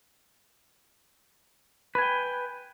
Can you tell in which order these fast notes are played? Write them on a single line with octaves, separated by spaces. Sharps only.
B4 G#5 G5